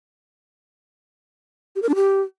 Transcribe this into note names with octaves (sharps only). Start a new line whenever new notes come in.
G4
A#4
D4
G4